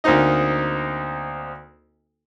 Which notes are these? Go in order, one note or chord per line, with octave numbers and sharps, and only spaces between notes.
D2 A#3 C4 D#4 D#5